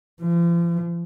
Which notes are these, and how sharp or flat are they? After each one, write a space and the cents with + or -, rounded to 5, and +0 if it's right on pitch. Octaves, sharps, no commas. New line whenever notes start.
F3 -40